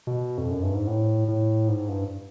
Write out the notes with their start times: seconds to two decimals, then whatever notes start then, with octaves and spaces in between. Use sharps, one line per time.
0.07 B2
0.38 F2
0.51 F#2
0.62 G2
0.75 G#2
0.87 A2
1.28 A2
1.68 G#2
1.88 G2